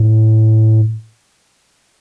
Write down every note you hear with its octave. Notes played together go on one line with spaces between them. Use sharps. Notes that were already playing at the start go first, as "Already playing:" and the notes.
Already playing: A2